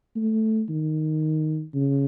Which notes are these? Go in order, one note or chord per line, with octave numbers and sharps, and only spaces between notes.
A3
D#3
C#3